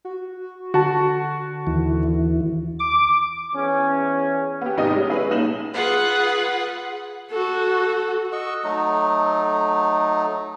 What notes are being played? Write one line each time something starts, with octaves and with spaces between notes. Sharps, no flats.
F#4
D3 F#4 A5
D#2 E3
D6
E2 C#4
B3 G4
G#1 C3 D#4 D#5
G3 G#3 C#4
E4 G#4 B4 C#5
B1 A#2 D#4 E7 F#7
F4 G#4 B4 F#5
F#4 A4
F#4 D#5 C#6 E6
F#3 A3 D#4